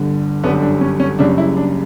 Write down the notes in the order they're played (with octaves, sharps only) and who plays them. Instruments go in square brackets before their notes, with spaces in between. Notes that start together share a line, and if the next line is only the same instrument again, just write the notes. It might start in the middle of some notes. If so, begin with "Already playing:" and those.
Already playing: [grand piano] G1 G2 D3
G1 F#2 D3 G3 B3
D4
C#4
C#4
F#1 F#2 C#3 G3 D4
E4
D4